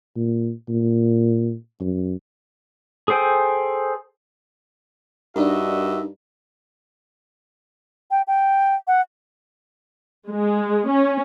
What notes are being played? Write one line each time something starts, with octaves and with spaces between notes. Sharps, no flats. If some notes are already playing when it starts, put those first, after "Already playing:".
A#2
A#2
F#2
G#4 A4 C5 G5 G#5
G2 D4 D#4 F#4 A#4 D#5 E5
G5
G5
F#5
G#3
C#4